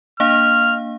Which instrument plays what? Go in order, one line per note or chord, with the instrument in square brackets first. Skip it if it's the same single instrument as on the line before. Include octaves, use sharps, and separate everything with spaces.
[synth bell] A#3 D4 F5 [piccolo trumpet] F6